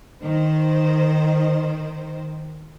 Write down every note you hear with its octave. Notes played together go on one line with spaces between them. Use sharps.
D#3 C5